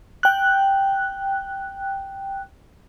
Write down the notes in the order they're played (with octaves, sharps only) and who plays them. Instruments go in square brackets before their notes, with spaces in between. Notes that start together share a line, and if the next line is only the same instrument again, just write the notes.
[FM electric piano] G5 F#6